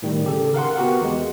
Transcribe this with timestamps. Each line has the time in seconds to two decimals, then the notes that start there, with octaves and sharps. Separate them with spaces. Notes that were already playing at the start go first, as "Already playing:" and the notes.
0.02 A2 D#3 G3
0.24 C#3 G4 A4
0.54 A#4 F5 F#5 C6
0.76 B3 F#4 G4 A#4 F#5
1.01 E2 G#3